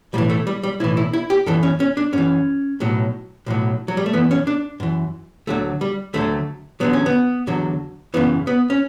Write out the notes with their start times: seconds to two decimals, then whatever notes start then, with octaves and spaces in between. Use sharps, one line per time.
0.13 B1 A2 E3 G3
0.30 A3
0.47 G3
0.63 G3
0.80 B1 A2 E3 E4
0.97 E4
1.13 E4
1.30 G4
1.46 F#2 E3 A4
1.63 C#4
1.80 C#4
1.97 D4
2.13 F#2 E3 C#4
2.80 B1 A2 F#3
3.46 B1 A2 F#3
3.88 F#3
3.97 G3
4.06 A3
4.13 F#2 E3 B3
4.31 C#4
4.47 D4
4.80 F#2 E3
5.47 D2 D3 F#3 A3
5.81 G3
6.14 D2 D3 F#3 A3
6.80 E2 D3 F#3 B3
6.93 C#4
7.06 B3
7.47 E2 D3 F#3
8.14 F#2 C#3 E3 B3
8.47 B3
8.70 C#4